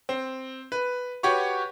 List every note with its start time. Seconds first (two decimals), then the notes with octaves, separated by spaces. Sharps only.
0.09 C4
0.72 B4
1.23 F#4 G4 B4 C#5 C#6